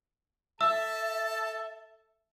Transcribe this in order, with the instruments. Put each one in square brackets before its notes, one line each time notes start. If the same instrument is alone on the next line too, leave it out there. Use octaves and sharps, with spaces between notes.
[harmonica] A4 A5 [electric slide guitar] E5 [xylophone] E6